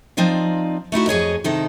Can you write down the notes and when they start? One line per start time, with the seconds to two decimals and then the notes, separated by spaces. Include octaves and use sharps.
0.17 F3 C4 D#4 D5 F5
0.92 A3 D#4 E4 F#4
1.07 F2 G#4 C#5 D#5
1.44 C3 D#3 D#4 E4 A4